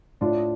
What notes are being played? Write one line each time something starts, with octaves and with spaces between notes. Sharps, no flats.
A2 D4 F4